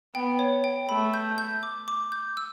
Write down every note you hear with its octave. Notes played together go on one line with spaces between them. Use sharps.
B3 G5
C#5
G5
A3 B5
G6
G6
D6
D6
G6
E6